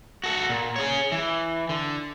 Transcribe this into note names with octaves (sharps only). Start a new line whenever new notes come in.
F#4 A4
A#2
G#4 C#5
E3
D3